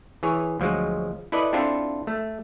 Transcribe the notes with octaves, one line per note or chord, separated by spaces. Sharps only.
E3 G#4 C#5
D2 F3 F#3 G#3
E4 A4 B4 D5 D#5
C4 D4 E4 F4 A4
A3